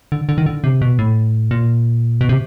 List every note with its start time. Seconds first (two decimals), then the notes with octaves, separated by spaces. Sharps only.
0.12 D3
0.29 D3
0.38 D#3
0.46 D3
0.64 C3
0.82 B2
0.99 A2
1.51 A#2
2.21 B2
2.29 C3